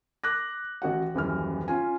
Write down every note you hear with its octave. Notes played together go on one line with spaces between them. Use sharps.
D6 F#6 A#6
A1 F#4 F#5
D#1 F#2 E3 F6
C#4 F4 G#5